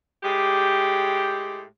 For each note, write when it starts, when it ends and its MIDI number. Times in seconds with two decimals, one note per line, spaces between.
0.23 1.63 45
0.23 1.63 56
0.23 1.63 67